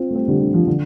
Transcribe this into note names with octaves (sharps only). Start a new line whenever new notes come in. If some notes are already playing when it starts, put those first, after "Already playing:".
Already playing: C4 F4
A3
G3 C4
D3 G3
D3 G3
F3
D3